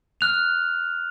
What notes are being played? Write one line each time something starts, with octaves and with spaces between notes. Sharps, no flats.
F6 F#6 F7